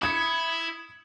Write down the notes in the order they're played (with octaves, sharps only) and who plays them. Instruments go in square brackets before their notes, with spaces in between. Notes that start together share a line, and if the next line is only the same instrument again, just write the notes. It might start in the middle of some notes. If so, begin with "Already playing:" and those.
[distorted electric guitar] E4 [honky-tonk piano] D#6 G#6 C#7